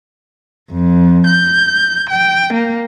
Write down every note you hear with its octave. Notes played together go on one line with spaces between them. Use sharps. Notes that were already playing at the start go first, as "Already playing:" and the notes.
F2
G6
G5
A#3